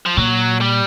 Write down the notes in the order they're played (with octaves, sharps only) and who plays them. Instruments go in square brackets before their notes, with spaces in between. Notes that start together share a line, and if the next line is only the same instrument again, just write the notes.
[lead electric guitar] F3
[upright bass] A#2 [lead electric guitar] F#3
[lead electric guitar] G3